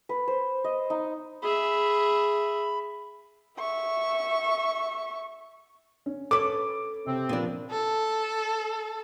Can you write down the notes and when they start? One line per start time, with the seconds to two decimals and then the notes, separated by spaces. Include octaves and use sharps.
0.09 B4
0.28 C5
0.64 D#5
0.90 D#4
1.42 G#4 E5 B5
3.59 E5 C#6
6.06 C#4
6.31 A4 B4 C#5 D6
7.06 C3 C4
7.29 A#2 F3 A#3 B3 D4
7.71 A4